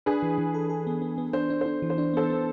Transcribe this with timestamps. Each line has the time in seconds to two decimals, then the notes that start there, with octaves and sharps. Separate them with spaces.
0.06 D4 G#4 B4
0.23 E3
0.38 E3
0.54 A4
0.70 A4
0.87 B3
1.02 B3
1.18 B3
1.33 D4 C5
1.50 D4
1.61 D4 C5
1.82 E3
1.90 C5
1.98 D4
2.14 B3 A4 C5
2.30 B3